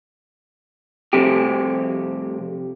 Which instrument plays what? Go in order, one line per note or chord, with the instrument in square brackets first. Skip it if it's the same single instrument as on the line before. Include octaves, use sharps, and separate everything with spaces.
[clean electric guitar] C2 F2 C3 G4